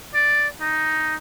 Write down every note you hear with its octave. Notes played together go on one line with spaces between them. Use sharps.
D5
D#4